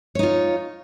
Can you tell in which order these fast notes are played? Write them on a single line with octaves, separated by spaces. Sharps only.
C#5 D#4 F4